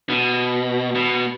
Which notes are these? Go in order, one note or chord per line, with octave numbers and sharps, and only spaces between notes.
B2
B2